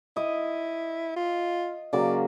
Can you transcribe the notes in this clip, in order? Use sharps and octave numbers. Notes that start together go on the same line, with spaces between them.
E4 D#5
F4
C#3 F#3 A#3 D5